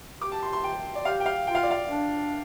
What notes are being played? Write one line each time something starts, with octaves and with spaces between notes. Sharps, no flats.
G4 D6
A5
C6
C6
G5
D5
G4 F5
G5
F5
F4 G5
F5
D5
F5
D4